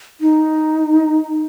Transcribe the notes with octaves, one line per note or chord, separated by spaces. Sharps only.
D#4